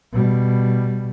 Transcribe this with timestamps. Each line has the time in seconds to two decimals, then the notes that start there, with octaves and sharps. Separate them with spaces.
0.12 B2 G3